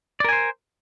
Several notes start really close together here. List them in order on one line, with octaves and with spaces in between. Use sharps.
D5 A#4 G#5 C5